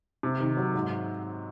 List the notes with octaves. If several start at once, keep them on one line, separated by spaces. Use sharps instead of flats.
C3
D#3
F#3
G#2